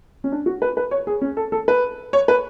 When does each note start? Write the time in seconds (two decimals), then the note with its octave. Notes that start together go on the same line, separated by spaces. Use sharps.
0.24 C#4
0.32 D4
0.46 F#4
0.62 B4
0.77 B4
0.91 C#5
1.07 G#4
1.21 C#4
1.37 A4
1.52 A4
1.68 B4
2.13 C#5
2.28 B4